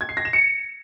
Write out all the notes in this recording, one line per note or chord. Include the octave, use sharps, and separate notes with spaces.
G#6
C7
A#6
E7
C#7